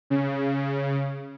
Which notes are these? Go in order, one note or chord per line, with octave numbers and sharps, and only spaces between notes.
C#3